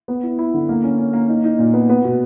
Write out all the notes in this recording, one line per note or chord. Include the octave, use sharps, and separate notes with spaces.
B3
E4
E4
D3
A#3
C#4
C#4
A#3
D#4
D#4
A#2
B3
B3
B2